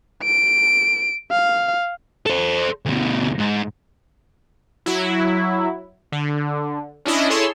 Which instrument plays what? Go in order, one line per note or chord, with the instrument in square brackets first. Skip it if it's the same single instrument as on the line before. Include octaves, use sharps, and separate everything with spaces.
[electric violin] D7
F5
[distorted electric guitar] A4 C5
D2 B2
G#2
[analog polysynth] F#3 E4
D3
C#4 D4 E4 D#5
E4 G#4 A4 C#5 C6 E6